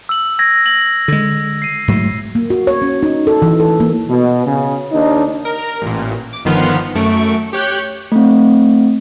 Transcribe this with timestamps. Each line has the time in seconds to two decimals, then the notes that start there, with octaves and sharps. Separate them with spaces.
0.09 E6 F#7
0.39 E6 G#6 A#6
0.66 F#7
1.08 D3 G#3
1.62 C7 D#7
1.88 G#2 F#3 A3
2.35 A#3
2.50 F#4
2.67 C#5
2.82 C#4
3.03 D#4
3.27 A4
3.42 E3
3.60 A4
3.80 A#3
4.09 B2
4.46 C#3
4.93 D#2 D4 D#4
5.45 A#4
5.82 A1 A#2
6.33 D6
6.45 G1 D#3 F3 B3 C6 F6
6.95 F#2 A3 C#6 D7
7.53 G4 C#5 F#6 G6
8.12 A3 C4